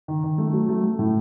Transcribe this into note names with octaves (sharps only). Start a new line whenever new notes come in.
D#3
D#3
A3
F#3
A3
A3
A2